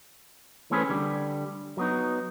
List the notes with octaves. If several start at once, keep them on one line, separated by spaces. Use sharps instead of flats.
E3 A3 C4 C#4 G#4 B4
D3 G3
F#3 B3 D#4